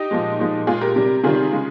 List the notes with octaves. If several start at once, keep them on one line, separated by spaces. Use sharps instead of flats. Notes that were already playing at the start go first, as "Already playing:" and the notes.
Already playing: D#4 G4
A#2 F3 G#3
A#2 F3 G#3
A#2 G#3 F4 G#4
G4 A#4
C3 G3
C3 D#3 G3 F4 G#4
C#3 G#3